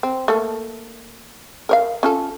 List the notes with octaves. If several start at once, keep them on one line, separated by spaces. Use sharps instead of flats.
C4
A3 A#3 A4
A#4 C#5 F5
C#4 F4 A4